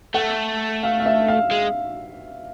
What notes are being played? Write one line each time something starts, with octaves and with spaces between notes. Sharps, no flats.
A3 F#5
F5
F5
E5
F5
G#3